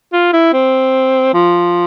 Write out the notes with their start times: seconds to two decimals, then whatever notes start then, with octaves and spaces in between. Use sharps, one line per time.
0.13 F4
0.33 E4
0.53 C4
1.34 F3